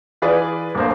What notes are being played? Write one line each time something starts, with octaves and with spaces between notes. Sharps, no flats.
E3 F4 G#4 B4 D5
D1 G2 A#3 C5